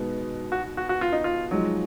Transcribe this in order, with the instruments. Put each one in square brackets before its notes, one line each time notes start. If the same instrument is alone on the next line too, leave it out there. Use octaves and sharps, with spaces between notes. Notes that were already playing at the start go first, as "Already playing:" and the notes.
Already playing: [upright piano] B2 G#3 B3 D#4
[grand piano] F#4
F#4
F#4
F4
D#4
F4
[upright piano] F3 G#3 D#4 [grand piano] F#3